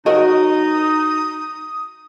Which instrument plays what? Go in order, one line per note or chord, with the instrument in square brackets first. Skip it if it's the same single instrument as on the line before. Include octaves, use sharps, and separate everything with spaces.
[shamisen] F#3 A#4 D#5 [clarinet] D#4 [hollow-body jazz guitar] F#4 F#5 [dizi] D#6